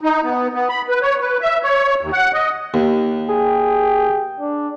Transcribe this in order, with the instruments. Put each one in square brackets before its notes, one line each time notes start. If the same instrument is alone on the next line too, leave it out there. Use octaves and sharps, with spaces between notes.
[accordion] D#4
B3
B3
B5
B4
C#5
B4
E5
C#5
D#2
F#5
D#5
[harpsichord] D#2
[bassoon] G#4 [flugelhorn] G5
[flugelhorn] D4